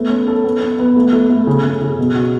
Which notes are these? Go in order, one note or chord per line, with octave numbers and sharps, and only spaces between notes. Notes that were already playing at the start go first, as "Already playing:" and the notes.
Already playing: A3 B3
C#4
A4
B3
B3
B3
A3
A3
A3
C#3
C#3
C#3
B2
F#4